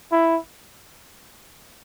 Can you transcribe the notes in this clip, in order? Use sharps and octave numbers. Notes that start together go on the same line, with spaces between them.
E4